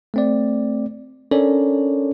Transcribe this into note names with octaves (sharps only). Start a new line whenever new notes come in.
A3 C4 D5
C#4 D4 A4 A#4 C#5 D5